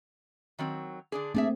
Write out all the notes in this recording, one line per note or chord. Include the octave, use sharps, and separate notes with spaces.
D#3 F#3 C4
D3 D4 G#4
A3 A#3 C4 D4 G#4 E5